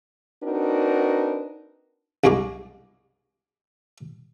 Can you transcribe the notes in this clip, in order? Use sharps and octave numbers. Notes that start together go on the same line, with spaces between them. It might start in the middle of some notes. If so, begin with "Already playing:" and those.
C4 D4 D#4 F#4 A#4 B4
C2 F#2 B2 G#3 D6